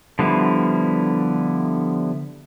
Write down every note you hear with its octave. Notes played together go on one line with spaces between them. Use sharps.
D3 F3 G3 B3 E4